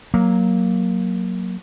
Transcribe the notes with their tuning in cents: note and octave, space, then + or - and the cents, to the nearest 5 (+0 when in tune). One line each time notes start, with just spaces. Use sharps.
F#3 +0 A#3 +0